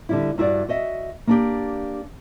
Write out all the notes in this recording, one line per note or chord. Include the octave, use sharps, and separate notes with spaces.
D3 G3 E4
G2 E4 F#4 D5
F#4 D#5 E5
A#3 D4 G4